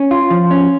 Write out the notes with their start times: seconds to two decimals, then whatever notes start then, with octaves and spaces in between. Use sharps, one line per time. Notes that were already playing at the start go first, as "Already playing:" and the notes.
Already playing: C#4
0.11 F4
0.30 F3
0.51 C#4